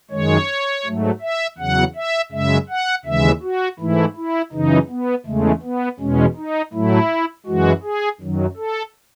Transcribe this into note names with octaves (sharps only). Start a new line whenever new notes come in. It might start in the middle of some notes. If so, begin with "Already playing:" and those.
F#2 D#3 G#3 C#5
G#2 F#3 A3
E5
E2 C#3 F#3 F#5
E5
F#2 C#3 G#3 E5
F#5
D#2 C#3 E3 G#3 E5
F#4
G#2 E3 A3 E4
E4
F#2 C#3 E3 D#4
B3
E2 C#3 G#3 A3
B3
E2 B2 G#3 C#4
D#4
A2 F#3 A3 E4
F#2 E3 G#3 F#4
G#4
F#2 D#3 F#3
A4